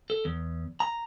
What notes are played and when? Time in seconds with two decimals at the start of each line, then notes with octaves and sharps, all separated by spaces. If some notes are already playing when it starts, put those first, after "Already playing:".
0.10 A4
0.25 E2
0.80 A#5